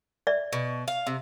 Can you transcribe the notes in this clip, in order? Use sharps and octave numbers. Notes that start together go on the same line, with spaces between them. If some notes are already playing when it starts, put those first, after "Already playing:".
D5 E5
B2
F5
C3